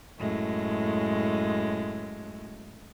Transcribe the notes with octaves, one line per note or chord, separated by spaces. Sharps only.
F#2 A2 G#3